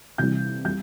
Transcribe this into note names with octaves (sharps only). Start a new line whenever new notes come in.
C3 E3 G3 G6
G3 G6